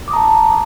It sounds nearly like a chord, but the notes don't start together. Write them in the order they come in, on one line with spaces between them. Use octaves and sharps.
D6 D#6 A#5 A5